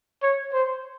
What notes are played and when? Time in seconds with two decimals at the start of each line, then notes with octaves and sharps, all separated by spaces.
0.22 C#5
0.53 C5